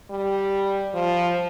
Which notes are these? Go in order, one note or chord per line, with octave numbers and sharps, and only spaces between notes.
G3
F3